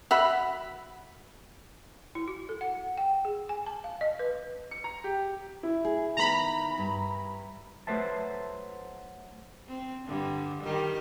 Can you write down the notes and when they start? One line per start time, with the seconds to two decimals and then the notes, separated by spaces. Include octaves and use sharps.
0.11 F#4 E5 B5
2.15 E4
2.28 F#4
2.49 A4
2.61 F#5
2.98 G5
3.25 G#4
3.49 G#5
3.66 A5
3.84 F5
4.01 D#5
4.19 B4
4.71 C#7
4.84 A#5
5.04 G4
5.63 E4
5.85 G#4
6.17 D#3 B3 A#5 B5
6.78 G2
7.87 F#3 A3 B4 C5 E5 A5
9.67 C4
10.06 G2 D3
10.63 D#3 G3 G4